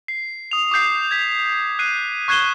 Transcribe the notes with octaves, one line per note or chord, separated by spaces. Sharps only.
C7
D#6 F7
D6 D#6 G6 C7
G#6 B6
F#6 C7 D#7
C#6 F#6 G#6 C7 E7 G7